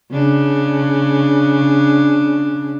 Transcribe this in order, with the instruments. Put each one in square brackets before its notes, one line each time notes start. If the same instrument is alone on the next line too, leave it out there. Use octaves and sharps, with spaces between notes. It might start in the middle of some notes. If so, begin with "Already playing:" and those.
[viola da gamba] C#3 D4